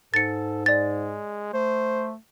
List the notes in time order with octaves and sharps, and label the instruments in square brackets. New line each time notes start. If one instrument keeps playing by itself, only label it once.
[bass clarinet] G#2 [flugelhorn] A4 [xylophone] A6 C#7
[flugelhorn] G#3 [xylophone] D5 A6
[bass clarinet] A3 [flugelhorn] C5